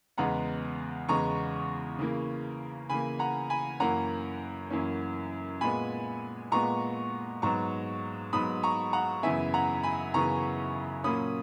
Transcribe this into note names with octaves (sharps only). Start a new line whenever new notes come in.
E2 C#3 G#3 B3 F#5 A#5
E2 C#3 G#3 B3 A#5 C#6
C#3 E3 A#3
C#3 E3 A#3 G#5 B5
F#5 A#5
G#5 B5
F#2 E3 A#3 C#4 F#5 A#5
F#2 E3 A#3 C#4
A#2 G#3 B3 G#5 B5
A#2 G#3 B3 A#5 C#6
G#2 F#3 B3 A#5 C#6
G#2 F#3 B3 B5 D#6
A#5 C#6
F#5 A#5
F#2 C#3 E3 B3 E5 G#5
F#5 A#5
G#5 B5
F#2 C#3 E3 B3 A#5 C#6
A#2 F#3 A#3 C#4 B5 D#6